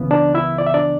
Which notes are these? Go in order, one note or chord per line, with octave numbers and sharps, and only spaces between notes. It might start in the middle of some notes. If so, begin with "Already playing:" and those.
Already playing: C#2 C#3 E3 B3
D4 D5
E4 E5
D5
E5
D4 D5